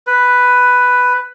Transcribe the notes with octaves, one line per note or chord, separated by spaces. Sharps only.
B4